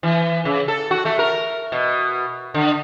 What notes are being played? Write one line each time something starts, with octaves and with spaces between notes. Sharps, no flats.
E3
C#3
A4
F#4
A3
A#4
B2
D3